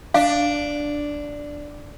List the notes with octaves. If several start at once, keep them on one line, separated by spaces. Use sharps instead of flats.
D4 F5